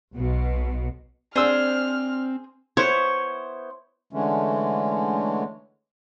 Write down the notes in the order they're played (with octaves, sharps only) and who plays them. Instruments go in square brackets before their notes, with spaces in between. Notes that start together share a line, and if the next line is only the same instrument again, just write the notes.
[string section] B1 B2
[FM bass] C4 [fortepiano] D4 E6 [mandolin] G#4 C5 [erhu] F6
[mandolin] B3 E4 C5 [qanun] C#5
[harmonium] D3 E3 G#3 A3 C#4